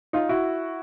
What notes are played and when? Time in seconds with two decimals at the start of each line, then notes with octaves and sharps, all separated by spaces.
0.13 D#4 F4
0.29 E4 F#4